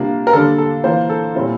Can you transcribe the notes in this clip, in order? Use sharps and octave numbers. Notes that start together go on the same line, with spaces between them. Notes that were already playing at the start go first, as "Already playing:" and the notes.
Already playing: C3 G3 A#3 D4 F4
A#4
D3 G3 A#3 D4 A4
A4
E3 A#3 F4 C5
A4
A#2 G3 C4 E4